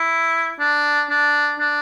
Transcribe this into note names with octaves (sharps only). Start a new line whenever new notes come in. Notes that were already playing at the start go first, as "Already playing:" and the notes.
Already playing: E4
D4
D4
D4